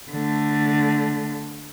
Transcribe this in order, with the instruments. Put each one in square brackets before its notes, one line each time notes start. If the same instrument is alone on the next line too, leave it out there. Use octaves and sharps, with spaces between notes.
[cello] D3 A3